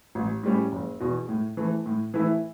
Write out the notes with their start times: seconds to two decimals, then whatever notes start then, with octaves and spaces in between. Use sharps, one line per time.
0.15 A1
0.43 A2 G3 C#4
0.72 F#1
1.00 E2 B2
1.29 A2
1.57 E3 A3
1.86 A2
2.14 E3 A3 E4